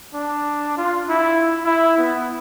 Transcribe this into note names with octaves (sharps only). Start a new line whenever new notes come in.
D4
F4
E4
E4
B3